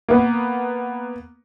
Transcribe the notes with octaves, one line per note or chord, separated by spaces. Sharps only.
A#3 B3